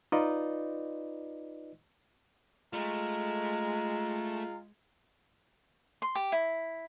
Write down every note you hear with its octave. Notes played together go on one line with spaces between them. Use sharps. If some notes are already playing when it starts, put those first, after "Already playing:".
D#4 F4 B4 D5 D#5
G#3 A3 F4 A#5
C6
G4
E4